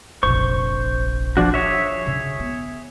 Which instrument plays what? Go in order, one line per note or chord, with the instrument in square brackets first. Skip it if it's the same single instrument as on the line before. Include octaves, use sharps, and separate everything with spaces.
[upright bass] F1 A#1 [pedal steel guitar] C5 C#6
[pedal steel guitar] F3 D4 F#4
G#4 C#5 E5
[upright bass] C#3
B3